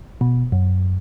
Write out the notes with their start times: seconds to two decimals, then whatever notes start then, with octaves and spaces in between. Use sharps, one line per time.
0.21 B2
0.52 F#2